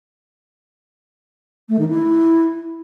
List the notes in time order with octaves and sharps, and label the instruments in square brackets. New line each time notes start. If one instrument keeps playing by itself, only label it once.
[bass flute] A3
D#3
E4